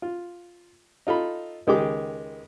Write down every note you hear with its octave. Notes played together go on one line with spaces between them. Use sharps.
F4
D#4 F4 A4 B5
C#2 D#3 G#3 G4 G#4 D6